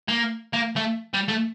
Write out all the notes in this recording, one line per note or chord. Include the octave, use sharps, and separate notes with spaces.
A#3
A#3
A3
G3
A3